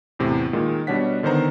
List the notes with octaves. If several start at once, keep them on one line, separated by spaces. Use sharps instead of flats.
E2 A2 C3
A#2 D#3 G#3
B2 G3 D4 C#5 F#5 B6
D3 D#3 B3 C5 A#5